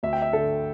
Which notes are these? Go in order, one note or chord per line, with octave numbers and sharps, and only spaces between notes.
D2 E5
G5
E5
D3 A4